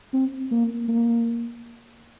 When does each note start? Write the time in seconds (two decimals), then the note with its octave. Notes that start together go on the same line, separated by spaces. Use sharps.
0.14 C4
0.51 A#3
0.88 A#3